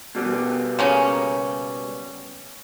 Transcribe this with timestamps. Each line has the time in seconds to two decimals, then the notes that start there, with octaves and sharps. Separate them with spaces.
0.15 B2 G3 B3
0.79 C#3 A#3 C#4